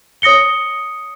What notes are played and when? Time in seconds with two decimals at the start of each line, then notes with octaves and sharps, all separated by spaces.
0.22 C#5 D#6 A#6 C#7 G7